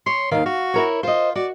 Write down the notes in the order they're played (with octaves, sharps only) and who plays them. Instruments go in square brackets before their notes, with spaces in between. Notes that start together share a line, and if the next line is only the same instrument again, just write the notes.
[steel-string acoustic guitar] C#5 [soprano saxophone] C6
[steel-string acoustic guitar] D#2 D#3 [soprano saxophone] F5
[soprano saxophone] F#4 [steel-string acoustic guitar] F5
[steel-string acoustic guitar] E4 A#4 C#5
[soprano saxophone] F4 [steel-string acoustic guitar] C5 D#5
[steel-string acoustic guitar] F#4 [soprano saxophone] D5